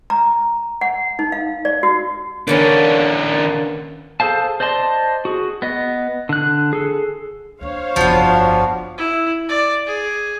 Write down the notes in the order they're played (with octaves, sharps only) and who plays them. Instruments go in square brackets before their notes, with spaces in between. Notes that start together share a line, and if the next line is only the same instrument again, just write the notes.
[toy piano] A#5
F#5
D#4
F5
D5
F#4
[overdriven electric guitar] D#3 D4 [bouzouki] A#3 B3 C#4
[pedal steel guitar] G#4 A4 C5 F5 A5
C5 D5 D#5 A5 C6
F#4 G#4
B3 D#5
D3 F#6
G#4 A4
[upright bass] D#2 D4 [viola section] C5 C#5 F5
[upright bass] G1 F2 [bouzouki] F3 B3 [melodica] D4 F#4
[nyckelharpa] E4
D5
G#4